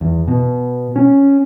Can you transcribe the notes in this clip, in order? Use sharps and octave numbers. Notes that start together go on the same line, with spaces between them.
E2
B2
C#4